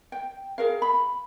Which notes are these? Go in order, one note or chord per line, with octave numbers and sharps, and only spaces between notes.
G5
G#4 A#4 F5
B5